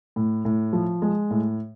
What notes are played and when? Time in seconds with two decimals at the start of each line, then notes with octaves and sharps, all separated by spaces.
0.16 A2
0.45 A2
0.73 F3
1.02 G#3
1.31 A2